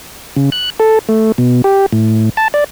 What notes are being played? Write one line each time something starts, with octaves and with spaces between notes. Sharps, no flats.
C#3
F#6
A4
A3
B2
G4
A2
A5
D5